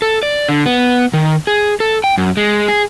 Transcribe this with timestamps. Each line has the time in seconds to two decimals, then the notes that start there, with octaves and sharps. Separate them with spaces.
0.02 A4
0.23 D5
0.49 D3
0.66 B3
1.13 D#3
1.47 G#4
1.80 A4
2.04 G5
2.18 F#2
2.37 G#3
2.68 G#4